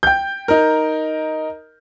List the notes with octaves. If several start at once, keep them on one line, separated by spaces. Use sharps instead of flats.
G5 G6
D#4 A#4